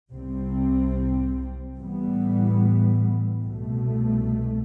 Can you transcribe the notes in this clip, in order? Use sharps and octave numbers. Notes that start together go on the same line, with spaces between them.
C2 C3 G3 C4
A2 E3 G3 B3
C2 B2 A3